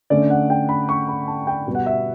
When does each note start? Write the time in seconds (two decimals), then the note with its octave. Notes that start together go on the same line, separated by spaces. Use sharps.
0.10 D3 A3 C#4 D5
0.30 F#5
0.50 G5
0.69 B5
0.89 C#6
1.08 B5
1.28 A5
1.47 G5
1.67 B2 G3 B3
1.75 F#5
1.86 E5